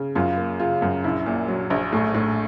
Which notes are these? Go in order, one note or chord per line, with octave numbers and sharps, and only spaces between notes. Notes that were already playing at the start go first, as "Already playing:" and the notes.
Already playing: C#3
F#2 F4
A#3
C#3 F4
F#2
A#1 E4
A#2
F#3
A#1
A2
A2